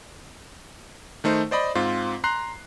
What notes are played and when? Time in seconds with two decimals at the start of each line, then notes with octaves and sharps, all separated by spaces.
1.24 D#3 A3 D#4 C5
1.51 C5 D5 D#5 B5
1.75 G#2 C4 F4
2.24 A#5 C6 F#6 C7